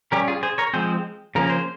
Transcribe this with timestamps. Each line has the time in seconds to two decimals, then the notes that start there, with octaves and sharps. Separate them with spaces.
0.12 G3 C#4 G4 A#4
0.28 F4 G#4
0.43 G#4 C5
0.58 A#4 C#5
0.74 F3 G#3 C4 G#4 C5
1.35 C#3 F3 A#3 C#4 A#4
1.50 C5